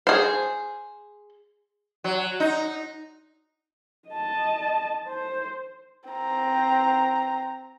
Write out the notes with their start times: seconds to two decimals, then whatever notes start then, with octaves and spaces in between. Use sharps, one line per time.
0.07 G#4 C5
2.04 F#3
2.40 D#4
4.09 D#5 A5
5.08 C5
6.09 C4 A#5